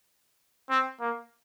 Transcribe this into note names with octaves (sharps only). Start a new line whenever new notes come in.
C4
A#3